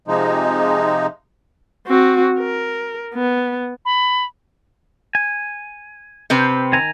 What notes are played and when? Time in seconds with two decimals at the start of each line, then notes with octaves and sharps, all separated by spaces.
0.08 C3 F3 G#3 D#4
1.86 C4 F#4
2.39 A#4
3.14 B3
3.85 B5
5.15 G#5
6.30 C3 C4 B4
6.73 D#3 G#5 A#5